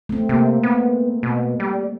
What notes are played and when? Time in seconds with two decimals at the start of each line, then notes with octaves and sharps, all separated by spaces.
0.09 A3 C4
0.29 C3 A#3
0.63 B3
1.23 B2
1.60 G3